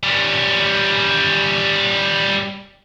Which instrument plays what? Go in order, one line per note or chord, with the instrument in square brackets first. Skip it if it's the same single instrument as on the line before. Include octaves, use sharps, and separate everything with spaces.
[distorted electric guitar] G3 C#4